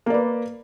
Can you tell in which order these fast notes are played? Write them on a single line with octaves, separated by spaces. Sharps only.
A#3 D5 B4